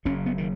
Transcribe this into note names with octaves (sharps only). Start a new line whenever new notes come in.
F#1 F#2 C#3 C#4
B3
D#3